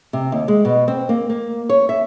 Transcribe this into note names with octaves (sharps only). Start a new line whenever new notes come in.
C3
D#2
G#3
B2
C4
A#3
A#3
C#5
E5